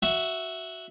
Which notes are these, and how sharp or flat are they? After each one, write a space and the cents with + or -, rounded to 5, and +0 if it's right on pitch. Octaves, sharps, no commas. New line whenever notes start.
F#4 +0 E5 +0